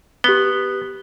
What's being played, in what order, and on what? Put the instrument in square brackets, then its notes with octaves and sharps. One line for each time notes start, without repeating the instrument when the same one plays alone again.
[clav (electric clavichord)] B3 [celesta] G4 G7